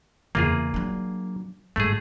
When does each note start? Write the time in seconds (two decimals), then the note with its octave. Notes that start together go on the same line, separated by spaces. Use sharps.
0.35 E2 C#3 A#3 F4 G#4
0.74 F#3 D4
1.76 G1 G#2 A3 G#4